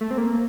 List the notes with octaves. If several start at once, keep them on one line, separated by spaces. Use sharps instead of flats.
A3
C4
A#3